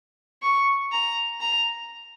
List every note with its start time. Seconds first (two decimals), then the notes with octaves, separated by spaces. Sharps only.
0.42 C#6
0.92 A#5
1.41 A#5